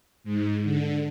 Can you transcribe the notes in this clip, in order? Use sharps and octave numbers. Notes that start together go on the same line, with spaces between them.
G#2
D3